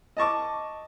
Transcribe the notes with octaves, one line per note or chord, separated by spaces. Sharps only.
D#5 A5 C#6 D6